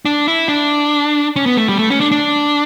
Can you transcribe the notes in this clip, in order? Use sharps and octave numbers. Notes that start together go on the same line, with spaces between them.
D4
E4
D4
C#4
B3
A3
G3
A3
C#4
D4
D4